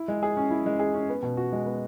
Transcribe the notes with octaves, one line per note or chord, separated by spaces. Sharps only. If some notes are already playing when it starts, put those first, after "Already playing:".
Already playing: E4
G#3
G#4
C#4
E4
G#3
G#4
C#4
B3
B2
F#4
G#3
B3